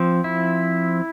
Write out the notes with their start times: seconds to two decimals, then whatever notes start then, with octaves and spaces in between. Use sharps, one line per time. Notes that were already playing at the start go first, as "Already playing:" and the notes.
Already playing: F3 C4
0.24 E4